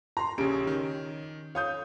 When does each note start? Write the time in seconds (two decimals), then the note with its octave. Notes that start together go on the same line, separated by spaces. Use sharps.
0.17 A#5 C6
0.38 A#1 C#3 C#4 G4 D7
0.67 D#3
1.55 C#5 F5 D#6 G6